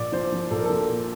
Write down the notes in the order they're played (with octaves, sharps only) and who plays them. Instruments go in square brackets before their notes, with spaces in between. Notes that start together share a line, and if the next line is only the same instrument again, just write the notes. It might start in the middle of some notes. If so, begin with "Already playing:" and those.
Already playing: [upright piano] A#1 D5
F3 C5
F3
A#1 A4
A#4
F3 A4
A#2